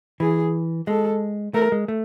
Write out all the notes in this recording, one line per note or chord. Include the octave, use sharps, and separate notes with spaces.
E3 G#4
G#3 A4
A3 A#4
G#3
A3